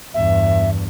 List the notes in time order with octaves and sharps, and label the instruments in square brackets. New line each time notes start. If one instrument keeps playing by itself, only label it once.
[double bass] E2 G2 [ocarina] E5